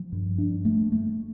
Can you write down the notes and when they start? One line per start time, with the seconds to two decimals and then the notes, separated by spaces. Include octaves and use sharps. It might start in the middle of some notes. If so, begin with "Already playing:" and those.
Already playing: F3
0.12 G2
0.38 D4
0.65 A3
0.92 A3